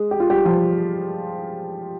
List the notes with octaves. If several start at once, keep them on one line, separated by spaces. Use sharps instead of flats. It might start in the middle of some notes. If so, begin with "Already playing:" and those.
Already playing: G#3 G#4
G4
F4
G3 G4
F3 F4